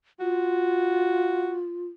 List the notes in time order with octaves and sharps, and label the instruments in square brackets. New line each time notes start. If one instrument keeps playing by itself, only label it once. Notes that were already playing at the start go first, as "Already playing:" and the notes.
[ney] F4 [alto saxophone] F#4